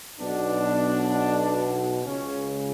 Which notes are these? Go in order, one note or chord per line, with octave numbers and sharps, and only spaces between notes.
B1 B2 D4
C#2 C#3 C#4